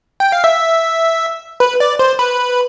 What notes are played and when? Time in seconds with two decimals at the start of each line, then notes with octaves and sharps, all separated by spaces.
0.20 G5
0.32 F5
0.44 E5
1.60 B4
1.80 D5
1.99 C5
2.19 B4